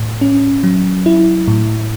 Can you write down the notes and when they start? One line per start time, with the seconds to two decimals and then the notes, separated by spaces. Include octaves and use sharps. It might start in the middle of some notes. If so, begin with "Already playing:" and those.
Already playing: A2
0.21 C#4
0.64 F#3
1.06 E4
1.48 A2